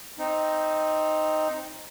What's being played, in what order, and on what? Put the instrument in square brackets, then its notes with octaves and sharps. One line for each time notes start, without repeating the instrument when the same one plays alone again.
[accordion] C4 D#4